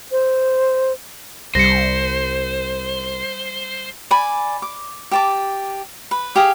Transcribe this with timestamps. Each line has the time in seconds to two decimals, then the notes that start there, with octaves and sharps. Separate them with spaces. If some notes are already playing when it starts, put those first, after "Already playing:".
0.12 C5
1.55 C2 G3 C5 A#6 C#7
4.11 D5 G#5 B5
4.62 D6
5.11 G4 A5 D6
6.11 B4
6.36 G4 G#4 F5 D#6